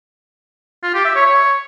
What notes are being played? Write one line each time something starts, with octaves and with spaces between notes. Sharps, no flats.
F4
G4
E5
C#5
C#5